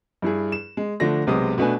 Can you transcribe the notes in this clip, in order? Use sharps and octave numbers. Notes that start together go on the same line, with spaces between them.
G2 E4 G#4
E7
G#3
D3 F3 A3 D4 A#6
B1 C3 G#3 B3 D#6
B2 A3 D4 B4 G#5